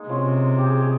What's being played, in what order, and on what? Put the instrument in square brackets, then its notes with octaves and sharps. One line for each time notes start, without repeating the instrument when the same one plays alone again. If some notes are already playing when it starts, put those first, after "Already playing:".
Already playing: [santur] G#3 A#3 D#4
[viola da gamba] C3 [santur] C#4 F4
[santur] G4
G#4
G4
G#4